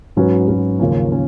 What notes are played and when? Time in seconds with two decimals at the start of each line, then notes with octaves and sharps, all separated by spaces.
0.16 G#2 F#3 C#4 F#4 B4
0.48 G#2 F#3 C#4 F#4 B4
0.80 D#2 C#3 F3 A#3 C#4
1.12 A#3 C#4